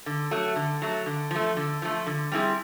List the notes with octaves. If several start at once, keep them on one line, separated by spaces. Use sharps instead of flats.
D3
F#3 A3
D3
F#3 A3
D3
F3 A3
D3
F3 A3
D3
G3 C4 E4 G#4